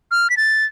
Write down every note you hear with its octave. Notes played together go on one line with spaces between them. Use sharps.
F6
B6
A6